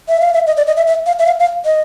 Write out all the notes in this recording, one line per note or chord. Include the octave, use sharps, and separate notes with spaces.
E5
F5
E5
D#5
D5
D#5
E5
E5
F5
E5
F5
F5
D#5